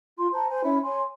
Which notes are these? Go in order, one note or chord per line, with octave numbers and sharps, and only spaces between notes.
F4 C6
C5 A5 A#5
C5 G#5
C#4 E4 C#5 B5
C#5 G#5 C6